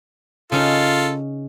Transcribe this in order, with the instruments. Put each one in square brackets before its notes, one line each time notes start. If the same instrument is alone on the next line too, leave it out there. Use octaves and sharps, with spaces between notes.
[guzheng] C#3 C#4 D#4 [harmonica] F4 A4